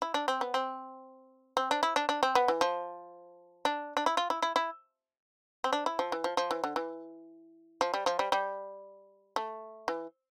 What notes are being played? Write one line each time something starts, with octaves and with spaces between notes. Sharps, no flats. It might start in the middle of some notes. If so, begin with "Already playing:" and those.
E4
D4
C4
B3
C4
C4
D4
E4
D4
D4
C4
B3
E3
F3
D4
D4
E4
F4
E4
E4
E4
C4
D4
E4
F3
E3
F3
F3
E3
D3
E3
F3
G3
F3
G3
G3
A3
E3